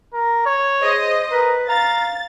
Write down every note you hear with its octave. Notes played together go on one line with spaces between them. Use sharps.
A#4
C#5
G#4 C5 D#5
A#4 B4
F5 A#5 A6